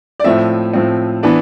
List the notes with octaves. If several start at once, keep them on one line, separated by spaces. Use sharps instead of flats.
D5
A2 F3 C4 E5
A2 F3 C4
E3 B3 D4